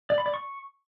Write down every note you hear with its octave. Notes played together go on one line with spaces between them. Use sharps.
D5
B5
D5
C#6